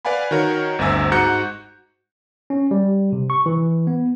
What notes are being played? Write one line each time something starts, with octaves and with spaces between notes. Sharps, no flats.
B4 D5 F5 F#5 G#5 B5
D#3 F#4 A#4 C#5
G1 D2 C4 E5 G#5 E6
G#2 F#4 A#5 F#6 G6 C#7
C#4
G3
C3
C#6
E3
B3